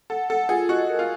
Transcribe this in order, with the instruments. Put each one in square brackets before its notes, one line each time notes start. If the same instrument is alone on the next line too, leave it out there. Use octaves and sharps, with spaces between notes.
[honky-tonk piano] A4 [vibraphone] F#5
[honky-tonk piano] A4 [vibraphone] F#5
[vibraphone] F4 [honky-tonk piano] G#4
[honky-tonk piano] F#4 [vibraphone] D#5
[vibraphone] A#4
[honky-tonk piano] F4